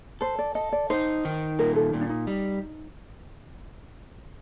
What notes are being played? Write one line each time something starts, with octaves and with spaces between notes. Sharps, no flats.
A4 C5
D5
A4 D#5
D5
D#4 C5
D#3
A#2 A#4
A4
A#2
D4
D#4
G3